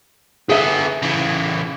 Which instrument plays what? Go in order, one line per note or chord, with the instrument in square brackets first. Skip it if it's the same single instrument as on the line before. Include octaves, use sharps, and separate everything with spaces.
[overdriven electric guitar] D3 B3 [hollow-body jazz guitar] G#4 E5
[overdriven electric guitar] C#3 E3